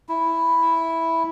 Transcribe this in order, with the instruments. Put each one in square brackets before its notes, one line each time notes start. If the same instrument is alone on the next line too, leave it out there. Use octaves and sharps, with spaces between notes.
[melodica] E4